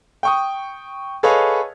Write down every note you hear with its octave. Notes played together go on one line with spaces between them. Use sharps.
G5 C#6 D#6
G#4 A4 B4 C#5 D#5 F5